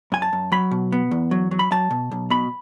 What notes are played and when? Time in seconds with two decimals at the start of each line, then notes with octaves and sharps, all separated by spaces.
0.12 F#2 G#5
0.22 A5
0.33 F#2
0.52 F#3 B5
0.71 B2
0.92 B3
1.11 E2
1.31 F#3
1.51 F#3
1.59 B5
1.71 F#3 A5
1.91 B2
2.11 B1
2.30 B2 B5